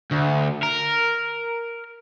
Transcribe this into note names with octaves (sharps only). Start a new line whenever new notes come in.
D2
A#4